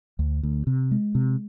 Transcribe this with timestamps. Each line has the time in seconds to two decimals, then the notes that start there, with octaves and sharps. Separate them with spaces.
0.19 D2
0.43 D2
0.67 C3
0.91 G#3
1.15 C3